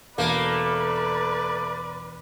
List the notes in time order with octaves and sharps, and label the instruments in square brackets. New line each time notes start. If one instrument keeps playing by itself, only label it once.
[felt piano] E1 [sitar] A3 A#3 [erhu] B4 [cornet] D5